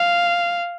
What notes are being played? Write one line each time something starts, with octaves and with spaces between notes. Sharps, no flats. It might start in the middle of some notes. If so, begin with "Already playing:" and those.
Already playing: F5